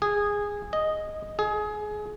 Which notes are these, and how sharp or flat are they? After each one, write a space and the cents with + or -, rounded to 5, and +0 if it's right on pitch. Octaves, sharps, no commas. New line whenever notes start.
G#4 -15
D#5 +0
G#4 +20